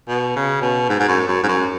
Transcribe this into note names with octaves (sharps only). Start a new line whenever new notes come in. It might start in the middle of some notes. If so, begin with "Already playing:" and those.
B2
C#3
B2
G#2
G#2
F#2
F#2
G#2
F#2